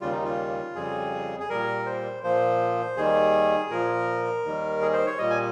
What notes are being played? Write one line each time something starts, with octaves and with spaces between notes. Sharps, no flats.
D#2 C#3 G3 F4
D#4
F4
F2 C#3 G3 G#4
G#4
A#2 G3 A#4
C5
A#2 F3 C5
D#2 D#3 G3 G#4
A#2 F3 A#4
D#2 D#3 G3
G#4
C5
C#5
A#2 G3 D#5
G#5